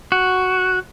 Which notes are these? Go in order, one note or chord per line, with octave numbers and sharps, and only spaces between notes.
F#4